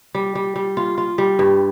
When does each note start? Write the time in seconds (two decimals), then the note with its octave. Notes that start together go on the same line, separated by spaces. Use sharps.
0.15 G3
0.35 G3
0.56 G3
0.77 F4
0.98 F4
1.18 G3
1.39 G2